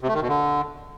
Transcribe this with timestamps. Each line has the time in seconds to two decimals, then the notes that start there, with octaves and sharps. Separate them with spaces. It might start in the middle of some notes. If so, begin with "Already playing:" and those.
0.01 C3
0.08 A3
0.15 D#3
0.22 B2
0.28 D3